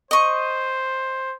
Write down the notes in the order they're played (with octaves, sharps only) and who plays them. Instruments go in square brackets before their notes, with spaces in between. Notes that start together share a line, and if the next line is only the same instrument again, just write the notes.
[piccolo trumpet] C5 [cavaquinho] D#5 C#6